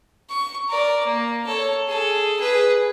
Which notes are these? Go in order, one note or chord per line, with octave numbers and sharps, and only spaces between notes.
C#6
A#4 D5
A#3
A4 C#5
G#4 A4
G#4 B4